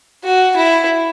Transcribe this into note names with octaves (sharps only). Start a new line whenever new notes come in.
F#4
E4